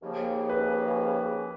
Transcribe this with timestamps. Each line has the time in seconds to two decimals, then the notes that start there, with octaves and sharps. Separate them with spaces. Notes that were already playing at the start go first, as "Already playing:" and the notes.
0.02 D#2 C#3 F3 A#3
0.49 B4